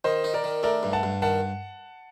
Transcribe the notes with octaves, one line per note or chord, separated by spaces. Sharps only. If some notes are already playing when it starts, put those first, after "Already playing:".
D#3 C5 D#5
D#4
A#4 D5
D#3
A3 A#4 D5
G2
F#5 A5
G2
D#3 F#5 A5